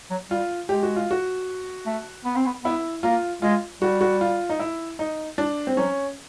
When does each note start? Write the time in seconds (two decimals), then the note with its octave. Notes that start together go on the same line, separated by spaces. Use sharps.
0.11 F#3
0.30 G3 F4
0.69 G#3 G4
0.83 F#4
0.96 F4
1.11 F#4
1.86 A3
2.25 B3
2.36 C4
2.46 B3
2.64 B3 E4
3.03 A#3 F4
3.42 G#3 F4
3.82 G3 F#4
4.01 F#4
4.21 F4
4.49 D#4
4.60 E4
4.99 D#4
5.38 D4
5.67 C4
5.77 F#3 C#4